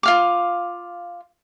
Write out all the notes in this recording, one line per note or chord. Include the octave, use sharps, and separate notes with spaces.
F4 F5 D6